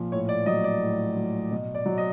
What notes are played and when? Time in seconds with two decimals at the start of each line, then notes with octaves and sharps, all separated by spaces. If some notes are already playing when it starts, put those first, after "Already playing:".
Already playing: A#2 F3
0.12 A2 C#5
0.29 D5
0.46 F#3 D#5
0.64 D5
0.81 A2
1.16 F#3
1.51 B2
1.75 D5
1.86 F#3
1.98 D#5